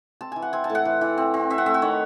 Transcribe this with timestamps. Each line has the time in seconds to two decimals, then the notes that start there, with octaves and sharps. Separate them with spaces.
0.21 C4 A5
0.32 E3 G#5
0.42 F#5
0.53 C4 G#5
0.64 A5
0.70 A2
0.75 F#5
0.85 E3
1.01 E3
1.18 C4
1.34 C4
1.50 C4 E5
1.58 F#5
1.66 A3 E5
1.74 F#5
1.82 D#3 C#5